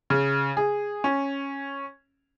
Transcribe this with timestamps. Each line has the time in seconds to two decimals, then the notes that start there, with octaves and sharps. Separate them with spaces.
0.10 C#3
0.57 G#4
1.04 C#4